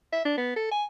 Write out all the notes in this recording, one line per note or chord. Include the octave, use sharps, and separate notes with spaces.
E5
D4
B3
A4
G#5